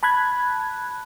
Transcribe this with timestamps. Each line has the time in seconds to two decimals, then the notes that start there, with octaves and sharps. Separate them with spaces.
0.03 A5 B5 F#6 G#6